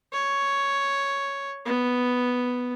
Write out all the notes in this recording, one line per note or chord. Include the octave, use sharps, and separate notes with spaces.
C#5
B3